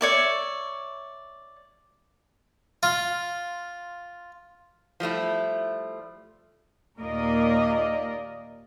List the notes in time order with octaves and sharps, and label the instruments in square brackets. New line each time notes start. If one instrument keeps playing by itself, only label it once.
[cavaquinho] C#5 D5 E5
[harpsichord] F4
[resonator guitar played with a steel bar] F3 G3 A3 E4
[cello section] D#2 A#2 A#3 A#4 D5 D#5